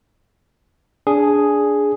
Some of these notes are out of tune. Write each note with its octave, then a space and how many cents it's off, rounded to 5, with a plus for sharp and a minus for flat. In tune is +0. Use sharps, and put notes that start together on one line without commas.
D4 -15 G#4 +0